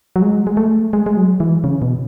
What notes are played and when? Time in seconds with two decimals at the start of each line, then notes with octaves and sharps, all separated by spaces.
0.16 F#3
0.22 G#3
0.47 G#3
0.57 A3
0.93 G#3
1.06 G#3
1.17 F#3
1.40 E3
1.64 C#3
1.82 B2